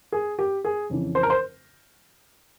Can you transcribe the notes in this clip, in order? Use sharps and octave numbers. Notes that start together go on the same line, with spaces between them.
G#4
G4
G#4
F2 C#3 E3
C5
A#4
C5